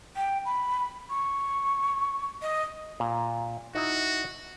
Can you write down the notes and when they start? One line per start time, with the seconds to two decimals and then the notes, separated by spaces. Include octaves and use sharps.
0.16 G5
0.45 B5
1.10 C#6
2.42 D#5
3.00 A#2
3.75 D#4 E4 F#4 A#5